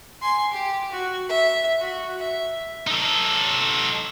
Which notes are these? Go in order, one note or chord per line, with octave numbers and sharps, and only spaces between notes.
G#5 C6
G4
F#4
E5
F#4
E5
D#4 A4